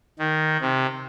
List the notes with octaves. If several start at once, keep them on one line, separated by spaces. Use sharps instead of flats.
D#3
C3